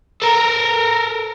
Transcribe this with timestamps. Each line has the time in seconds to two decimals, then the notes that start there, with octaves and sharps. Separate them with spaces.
0.22 A4 A#4